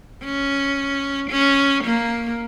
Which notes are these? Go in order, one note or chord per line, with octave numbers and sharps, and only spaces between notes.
C#4
C#4
A#3